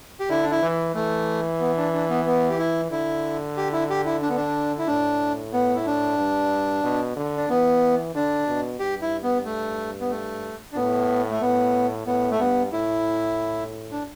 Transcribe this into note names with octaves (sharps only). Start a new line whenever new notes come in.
G4
D3 E4
D4
E4
E3
E3 A3
B3
D4
D4
B3
B3
G4
E4
D3 E4
G4
E4
G4
E4
D4
B3
D4
E4
A2 D4
B3
E4
D4
G2
B2
D3
D4
E3 B3
D3 D4
B2
G2 G4
E4
B3
A3
B3
A3
D4
A2 B3
A3
A2 B3
A2 B3
A3
G2 B3
A2 E4
D4